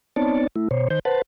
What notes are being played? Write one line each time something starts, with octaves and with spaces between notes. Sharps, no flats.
B3 C4 D#4 C#5 D5 A5
A3 E4
B2 C5 C#5
D#3 C5 G6
B4 C5 F#5 A5